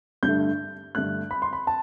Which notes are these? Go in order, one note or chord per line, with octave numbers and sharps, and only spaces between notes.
G2 D3 A3 G6
G2 D3 A3 F#6
B5
C6
B5
A5